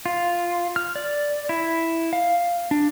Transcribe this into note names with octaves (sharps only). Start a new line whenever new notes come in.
F4
F6
D5
E4
F5
D4